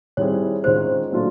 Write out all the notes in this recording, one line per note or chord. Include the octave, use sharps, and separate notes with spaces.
D#3 G3 C4 E4 G#4 C#5
D#3 G#3 C#4 F4 C5
A#2 F#3 A3 D4 F4